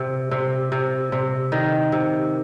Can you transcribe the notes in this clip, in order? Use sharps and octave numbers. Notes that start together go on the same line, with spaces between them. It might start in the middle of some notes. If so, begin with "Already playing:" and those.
Already playing: C3
C3
C3
C3
D#3
C3